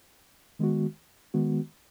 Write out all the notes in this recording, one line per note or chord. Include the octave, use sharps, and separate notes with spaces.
D#3 G#3 B3 F#4
D#3 G#3 B3 F#4